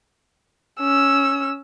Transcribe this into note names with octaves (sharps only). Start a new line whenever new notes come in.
C#4 E6